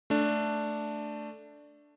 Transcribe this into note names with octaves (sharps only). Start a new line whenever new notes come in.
A3 D4